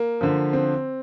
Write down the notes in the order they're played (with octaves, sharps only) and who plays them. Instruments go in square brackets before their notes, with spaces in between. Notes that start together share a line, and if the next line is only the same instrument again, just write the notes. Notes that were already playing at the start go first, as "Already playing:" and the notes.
Already playing: [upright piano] A#3
D3 F3
C4